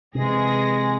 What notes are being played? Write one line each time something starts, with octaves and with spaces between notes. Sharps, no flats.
C3 E3 G#3 G#4 A#6